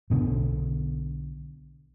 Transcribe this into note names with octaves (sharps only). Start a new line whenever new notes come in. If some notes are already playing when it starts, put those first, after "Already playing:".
B1 B2 D3